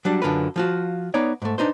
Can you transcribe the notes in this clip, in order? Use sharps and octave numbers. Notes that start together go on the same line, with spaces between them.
F#3 G3 D4
F#2 D3 F4 A#4 B4
F3 F4 F#4
B3 D#4 C#5 D5
G#2 A3
D4 D#4 B4 C5